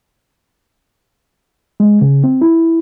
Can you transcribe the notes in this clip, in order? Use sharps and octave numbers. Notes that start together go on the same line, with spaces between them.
G#3
C#3
C4
E4